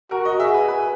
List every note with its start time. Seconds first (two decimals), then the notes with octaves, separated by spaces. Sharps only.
0.11 F#4 A#4
0.25 D#5
0.40 G#4 E5
0.54 B4
0.68 B4